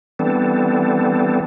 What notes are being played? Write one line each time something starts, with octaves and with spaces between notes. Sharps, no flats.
E3 G3 B3 C4 D4 A4